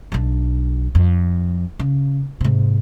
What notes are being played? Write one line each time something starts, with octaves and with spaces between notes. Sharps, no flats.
B1 D4
F2
C#3
G#2 C3